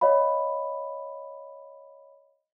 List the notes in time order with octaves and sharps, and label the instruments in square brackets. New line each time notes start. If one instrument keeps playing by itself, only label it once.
[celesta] C#5 D#5 F5 B5